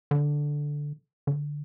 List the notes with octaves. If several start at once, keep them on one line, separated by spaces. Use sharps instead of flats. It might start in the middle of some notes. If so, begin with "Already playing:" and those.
D3
D3